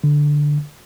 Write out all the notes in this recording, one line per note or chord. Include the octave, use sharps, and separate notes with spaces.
D3